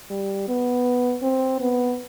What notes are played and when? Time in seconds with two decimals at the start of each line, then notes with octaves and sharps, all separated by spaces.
0.10 G3
0.48 B3
1.22 C4
1.61 B3